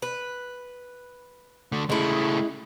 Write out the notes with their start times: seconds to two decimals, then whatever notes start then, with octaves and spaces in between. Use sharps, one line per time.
0.02 B4
1.72 D3 A3
1.90 C#3 G#3 A3 E4